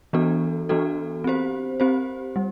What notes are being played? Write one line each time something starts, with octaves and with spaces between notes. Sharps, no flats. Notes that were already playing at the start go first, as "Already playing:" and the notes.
E3 B3 D4 F#4 A4
E3 B3 D4 F#4 A4
C4 G4 C5
C4 G4 C5
G3